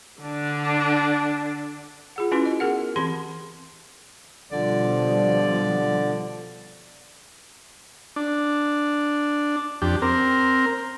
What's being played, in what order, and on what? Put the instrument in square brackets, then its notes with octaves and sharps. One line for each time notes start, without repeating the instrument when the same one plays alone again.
[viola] D3 D4
[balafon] F4 G#4 F#5
C#4 E4 F#4 B4 C6
D#5
B3 G#4 A#4 F#5
E3 C4 G4 B5 C6
[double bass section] B2 F3 G3 [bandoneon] D3 [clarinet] D5
[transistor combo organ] D4
F2 D4 G4
C4 A#4